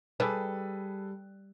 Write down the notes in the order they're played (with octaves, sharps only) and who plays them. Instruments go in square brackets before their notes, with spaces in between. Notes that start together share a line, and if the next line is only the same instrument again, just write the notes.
[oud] G3 [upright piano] G#4 A4 B4